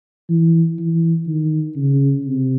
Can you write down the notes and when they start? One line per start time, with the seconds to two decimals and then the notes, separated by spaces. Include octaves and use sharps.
0.30 E3
0.79 E3
1.27 D#3
1.76 C#3
2.26 C3